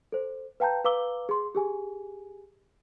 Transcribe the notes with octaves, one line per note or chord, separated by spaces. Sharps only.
A4 C5
B4 F5 G5 A5 A#5 G6
B4 F5 A#5 D6 E6 G7
G#4 C6
G4 G#4 G#5